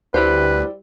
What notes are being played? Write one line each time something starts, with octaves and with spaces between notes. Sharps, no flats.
D2 G3 E4 G4 B4 C5